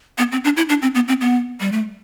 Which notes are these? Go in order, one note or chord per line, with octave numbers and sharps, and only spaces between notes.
B3
C4
D4
E4
D4
C4
B3
C4
B3
G3
A3